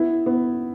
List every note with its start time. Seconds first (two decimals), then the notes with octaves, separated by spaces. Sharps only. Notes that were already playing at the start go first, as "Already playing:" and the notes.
Already playing: B3 E4
0.26 B3